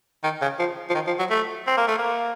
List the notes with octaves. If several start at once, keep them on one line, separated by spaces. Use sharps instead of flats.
D#3
C#3
F3
F3
D#3
F3
F#3
A3
C4
A#3
A3
A#3